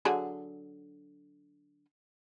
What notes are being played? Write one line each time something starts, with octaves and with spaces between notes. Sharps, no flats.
D3 F#3 G#4